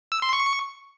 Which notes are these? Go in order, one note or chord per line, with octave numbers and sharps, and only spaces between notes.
E6
C6
C#6